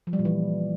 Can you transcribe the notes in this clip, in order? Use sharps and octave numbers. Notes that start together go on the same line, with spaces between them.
F3
G3
A#2
E3